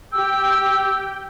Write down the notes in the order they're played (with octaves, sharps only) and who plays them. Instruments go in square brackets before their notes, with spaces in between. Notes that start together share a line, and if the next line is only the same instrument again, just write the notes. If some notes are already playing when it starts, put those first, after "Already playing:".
[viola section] G4 G5 [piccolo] E6